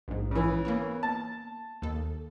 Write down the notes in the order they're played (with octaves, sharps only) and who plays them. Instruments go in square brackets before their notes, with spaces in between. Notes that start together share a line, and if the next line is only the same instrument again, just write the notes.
[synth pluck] A#1 G#2
[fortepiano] C#3 E3
[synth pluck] A#3 B3 C#5
[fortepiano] A5
[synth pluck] D#2 A4